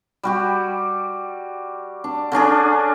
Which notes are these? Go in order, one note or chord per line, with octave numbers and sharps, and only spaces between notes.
G3 F#4 G4
D4
D3 C#4 D4 G#4